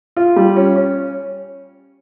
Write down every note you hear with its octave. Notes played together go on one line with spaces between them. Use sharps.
F4
G3
C#4
C#4